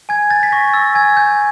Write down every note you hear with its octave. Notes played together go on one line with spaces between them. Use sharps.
G#5 G#6
G6 A6
B6
C#6 A#6
E6 A6
G#5 G#6
G6